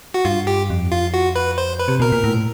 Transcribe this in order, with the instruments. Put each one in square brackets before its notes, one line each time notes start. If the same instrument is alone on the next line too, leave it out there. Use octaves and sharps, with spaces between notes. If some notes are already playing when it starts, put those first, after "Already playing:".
[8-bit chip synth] F#4
[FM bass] G2 [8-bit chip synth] F4
[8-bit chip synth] G4
[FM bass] F2
[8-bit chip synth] F4
F#4
B4
C5
B4
[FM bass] C3
[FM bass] B2 [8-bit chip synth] A#4
[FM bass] A#2
A2